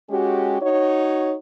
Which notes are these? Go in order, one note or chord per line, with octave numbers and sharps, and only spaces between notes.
G#3 C#4 F#4 G4
D#4 F#4 C#5